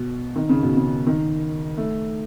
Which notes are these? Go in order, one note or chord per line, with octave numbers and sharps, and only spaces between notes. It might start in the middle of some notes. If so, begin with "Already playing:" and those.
Already playing: B2
D#3
C#3
B2
C#3
D#3
A3